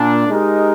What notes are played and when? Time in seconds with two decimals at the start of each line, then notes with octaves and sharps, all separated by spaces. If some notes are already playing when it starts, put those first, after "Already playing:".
Already playing: A#2 D4
0.28 G#3 D#4 G4 A#4